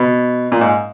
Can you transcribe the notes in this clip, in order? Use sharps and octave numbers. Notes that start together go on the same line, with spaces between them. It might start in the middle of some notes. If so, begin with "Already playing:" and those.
Already playing: B2
A#2
G#2